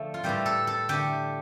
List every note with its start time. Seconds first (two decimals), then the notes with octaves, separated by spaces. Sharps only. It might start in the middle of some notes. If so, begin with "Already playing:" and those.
Already playing: D3 F3 A3
0.14 F4
0.24 A2 E3 G3 G4
0.46 A4
0.67 A4
0.89 D3 A3 G4